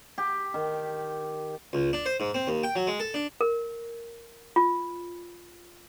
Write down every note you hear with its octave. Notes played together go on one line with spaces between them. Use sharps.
G4
D#3
C#2
D4
C5
G#2
C4
D#2
G5
F#3
G#3
A4
D4
A#4
F4